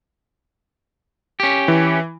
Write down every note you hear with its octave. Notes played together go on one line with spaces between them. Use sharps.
C#4 G4
E3